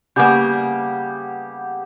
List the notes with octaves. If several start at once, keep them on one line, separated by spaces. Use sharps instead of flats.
C#3 G3 A#3 B3 G4